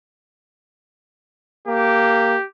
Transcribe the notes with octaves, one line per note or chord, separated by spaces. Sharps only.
A#3 G4